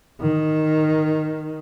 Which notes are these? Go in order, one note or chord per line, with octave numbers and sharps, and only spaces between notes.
D#3